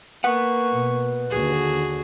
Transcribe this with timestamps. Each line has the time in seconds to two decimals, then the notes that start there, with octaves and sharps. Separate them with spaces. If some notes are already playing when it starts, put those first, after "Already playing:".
0.24 A#3 B4 F#5 C#6
0.70 B2
1.30 D#2 D3 F#4 G#4